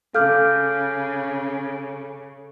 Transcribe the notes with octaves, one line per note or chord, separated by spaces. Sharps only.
C#3 A4 F5 D6 F6 G6